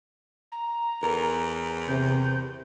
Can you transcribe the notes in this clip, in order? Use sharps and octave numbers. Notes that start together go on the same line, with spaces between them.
A#5
E2 A#4
C3 G6